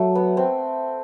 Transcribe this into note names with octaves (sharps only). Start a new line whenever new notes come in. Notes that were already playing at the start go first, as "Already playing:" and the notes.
Already playing: F#3 A3
B3
C4